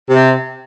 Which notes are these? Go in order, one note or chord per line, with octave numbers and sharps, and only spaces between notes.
C3